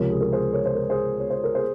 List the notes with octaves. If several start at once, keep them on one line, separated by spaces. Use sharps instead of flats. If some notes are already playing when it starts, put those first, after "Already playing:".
Already playing: C#2 C3 F3 A#4 C#5
G#4
A#4
G#4 C5
A#4 C#5
C5
A#4
G#4 C5
C#5
C5
A#4
G#4 C5